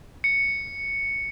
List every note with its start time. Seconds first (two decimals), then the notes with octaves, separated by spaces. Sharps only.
0.24 C#7